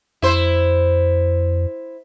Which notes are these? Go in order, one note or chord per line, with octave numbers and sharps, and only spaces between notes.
F2 E4 C5